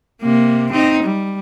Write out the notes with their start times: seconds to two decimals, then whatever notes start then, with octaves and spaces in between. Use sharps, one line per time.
0.22 C3 A#3
0.72 C4 D#4
1.03 G3